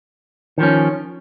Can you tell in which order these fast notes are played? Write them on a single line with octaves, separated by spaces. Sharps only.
D#3 F3 C#4